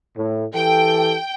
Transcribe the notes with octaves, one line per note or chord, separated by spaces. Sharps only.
A2
E3 G4 A4 G5